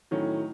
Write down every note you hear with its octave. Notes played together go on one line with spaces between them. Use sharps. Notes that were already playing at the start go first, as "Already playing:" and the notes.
A2 D#3 F#3 C#4